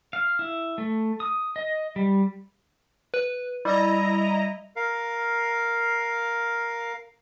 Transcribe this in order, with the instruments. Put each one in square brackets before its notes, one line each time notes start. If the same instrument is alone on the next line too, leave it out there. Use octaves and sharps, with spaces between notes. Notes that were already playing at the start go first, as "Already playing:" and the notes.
[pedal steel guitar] F5
E4
A3
D#6
D#5
G3
[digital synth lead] B4
[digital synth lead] G3 [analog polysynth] E4 D#5 A#5
[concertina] A#4 F5